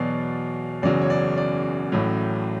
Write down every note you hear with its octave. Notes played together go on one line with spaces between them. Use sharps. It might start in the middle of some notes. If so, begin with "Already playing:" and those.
Already playing: E2 B2 F#3 D5
F#1 E2 C#3 F#3 D5
C#5
D5
D5
A1 A2 F#3